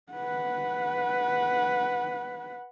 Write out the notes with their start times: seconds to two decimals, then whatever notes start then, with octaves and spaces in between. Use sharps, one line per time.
0.12 B4 F#5